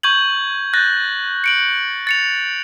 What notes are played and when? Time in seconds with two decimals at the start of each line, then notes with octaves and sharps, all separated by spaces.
0.03 C#6 G6 G#6 F#7
0.74 F#6 G6 A6 A#6
1.44 C#7 D7 F#7
2.07 A6 C#7 F7